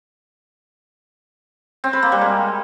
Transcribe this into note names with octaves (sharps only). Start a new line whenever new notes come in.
C4
B4
A#3
G3
G#3